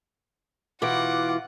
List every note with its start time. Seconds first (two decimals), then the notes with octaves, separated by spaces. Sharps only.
0.82 B2 E3 F4 F#5 D6